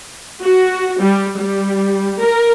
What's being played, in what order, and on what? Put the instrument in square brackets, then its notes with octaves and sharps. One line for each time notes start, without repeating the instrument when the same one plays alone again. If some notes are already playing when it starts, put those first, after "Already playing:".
[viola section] F#4
G3
G3
A#4